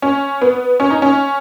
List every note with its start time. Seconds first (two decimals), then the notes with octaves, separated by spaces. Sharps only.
0.02 C#4
0.42 B3
0.80 C#4
0.90 D#4
1.02 C#4